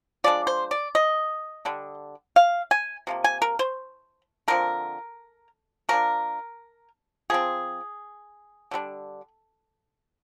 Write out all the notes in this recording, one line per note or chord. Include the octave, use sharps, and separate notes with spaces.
F3 G#3 D4 D5
C5
D5
D#5
D3 G3 D4
F5
G#5
C3 F3 A#3
G#5
A#4
C5
D3 F3 C4 A#4
F3 A#3 D4 A#4
F3 C4 G#4
D3 G3 D4